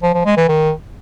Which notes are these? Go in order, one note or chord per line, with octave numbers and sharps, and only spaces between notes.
F3
F3
G#3
E3
D#3